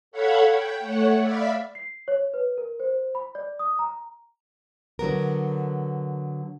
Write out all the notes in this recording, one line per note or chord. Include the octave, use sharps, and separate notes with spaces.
A4 C#5 F5 F#5 B5 G#6
G5
A3 C#5 F#5
D5 E5 F5 B5
C7
C#5
B4
A#4
C5
B5
D5
D#6
A#5
D3 F#3 B3 A#4